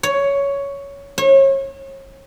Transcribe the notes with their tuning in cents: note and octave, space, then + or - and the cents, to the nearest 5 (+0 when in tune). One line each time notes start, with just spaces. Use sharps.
C#5 +10
C#5 -35